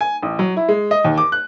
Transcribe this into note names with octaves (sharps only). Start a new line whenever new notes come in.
G#5
A1
F#3
E4
G#3
D#5
D#2
D6
F#6